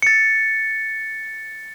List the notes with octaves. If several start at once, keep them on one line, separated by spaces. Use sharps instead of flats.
A6 C#7